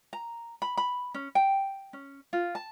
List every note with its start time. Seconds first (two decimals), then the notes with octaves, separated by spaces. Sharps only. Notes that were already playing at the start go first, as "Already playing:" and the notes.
0.13 A#5
0.62 B5
0.77 B5
1.14 C#4
1.35 G5
1.93 C#4
2.33 F4
2.55 A5